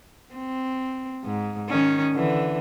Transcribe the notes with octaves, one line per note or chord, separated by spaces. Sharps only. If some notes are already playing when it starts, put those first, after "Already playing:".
C4
G#2
D#3 C#4
D3 E3